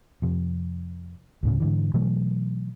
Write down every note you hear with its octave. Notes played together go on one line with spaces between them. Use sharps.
F2 C3
D2 A2 C#3
G#2 D3 E3
B2 E3 F#3 A3